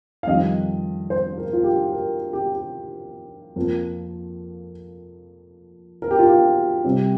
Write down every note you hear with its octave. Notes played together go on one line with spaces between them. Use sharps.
F5
F2 D#3 G3 C4 D#5
C5
A#4
F4
G4
A#4
G4
G4
F2 F3 A#3 A#4
A#4
G4
F4
G4
C3 G3 C4